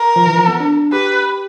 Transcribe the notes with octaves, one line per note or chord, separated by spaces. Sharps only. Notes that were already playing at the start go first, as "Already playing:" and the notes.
Already playing: A#4
F3
E3
F3
B3
D4
G4 B4